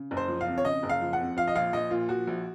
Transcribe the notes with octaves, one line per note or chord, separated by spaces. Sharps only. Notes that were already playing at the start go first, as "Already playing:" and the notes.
Already playing: C#3
F#1
C5
F3
F5
F2
C#5
C#3 D#5
F#1
F5
F3
F#5
F2
F3 F5
D#5
A#1 F5
A#1 D#5
A#2 F4
F3 F#4
A#1